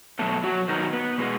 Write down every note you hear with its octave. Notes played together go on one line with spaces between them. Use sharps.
B2 F#3 A3 B3 A4
F#3 F#4
B2 D#3 F#3 B3 D#4
B3
B2 G#3 B3